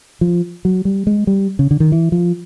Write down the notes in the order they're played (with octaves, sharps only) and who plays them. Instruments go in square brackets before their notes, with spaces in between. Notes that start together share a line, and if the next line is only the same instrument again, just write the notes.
[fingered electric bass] F3
F#3
G3
G#3
G3
C#3
D3
D#3
E3
F3